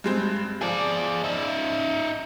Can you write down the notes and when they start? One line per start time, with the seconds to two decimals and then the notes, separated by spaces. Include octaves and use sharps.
0.04 G2 G#3 C4
0.61 F3 G#4 D5
1.24 D#4 E5